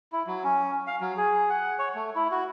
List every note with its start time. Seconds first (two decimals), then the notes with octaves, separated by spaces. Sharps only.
0.12 E4
0.27 F#3
0.44 C#4
0.87 F5
1.01 F#3
1.17 G#4
1.50 F#5
1.79 C#5
1.95 A3
2.16 E4
2.31 F#4